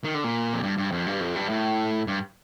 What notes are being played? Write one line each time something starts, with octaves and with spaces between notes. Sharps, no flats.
D#3
D3
A#2
F2
G2
G2
F2
G2
F2
G2
A2
G2